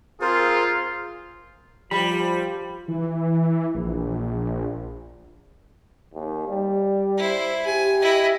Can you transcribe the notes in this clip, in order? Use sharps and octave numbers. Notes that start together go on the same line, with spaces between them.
C4 F4 G#4 A#4 C5
F3 G3 B5
E3
A#1
D#2
G3
E4 C5
G4 G#5
E4 D#5